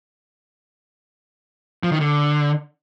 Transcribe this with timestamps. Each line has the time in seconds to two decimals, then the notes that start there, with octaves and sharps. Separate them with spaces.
1.83 F3
1.92 D#3
2.00 D3